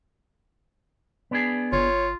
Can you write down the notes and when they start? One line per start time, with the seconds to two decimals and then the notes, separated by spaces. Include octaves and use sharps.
1.31 B3 D4 G#4
1.73 G1 F4 C#5